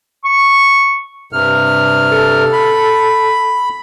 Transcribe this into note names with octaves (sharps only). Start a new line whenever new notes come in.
C#6
G2 C3 F6
A4
B5